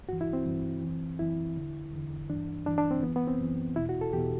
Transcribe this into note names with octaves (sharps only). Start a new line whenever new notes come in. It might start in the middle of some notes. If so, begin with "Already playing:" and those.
G2 E3 F#4
E4
C4
G2 E3
F#2 E3
F#2 E3 E4
E2 D3
E2 D3
G2 E3 D4
G2 E3 D4
D4
C4
F#2 E3 B3
B3
C4
F#2 E3
E2 B2 E4
F#4
A4
E2 B2 G4